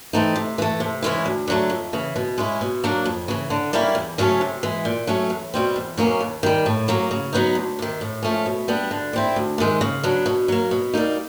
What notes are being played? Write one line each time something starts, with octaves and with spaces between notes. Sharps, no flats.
E3 A3 C4 D#4
C3
E3 A3
C3
E3 G#3 C#4 E4
D2
D3 F#3 A3
F2
C#3 E3
B2
G#3 C#4 E4
B2
F#3 A#3 D4
F2
C#3 E3
D3
G3 A#3 C#4 E4
E2
C#3 F#3 A3 C#4
C3
E3 G#3
A#2
F#3 A3 C#4
E2
B2 G3 C4
E2
B2 F#3 A#3 C#4
D#2
D#3 G3
A2
F#3 A#3 C#4
C#3
F#3 B3 D#4
D2
C3 D#3
A2
F3 A3 C#4
B2
G3 B3 D4
D3
G3 C4 E4
D2
C3 D#3 G#3
C#3
F#3 B3 D4
B2
F#3 A#3
B2
G3 A#3 D#4